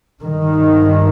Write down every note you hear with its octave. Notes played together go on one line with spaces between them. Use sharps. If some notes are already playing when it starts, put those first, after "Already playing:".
G2 D#3